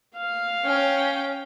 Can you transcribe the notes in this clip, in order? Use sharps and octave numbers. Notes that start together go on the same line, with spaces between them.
F5
C#4 G5